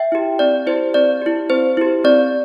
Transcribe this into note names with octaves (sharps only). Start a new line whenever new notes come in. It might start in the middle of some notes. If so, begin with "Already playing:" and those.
Already playing: E5 G5
E4 G4
C4 D5
E4 G4 C5
C4 D5
E4 G4
C4 C5
E4 G4
C4 D5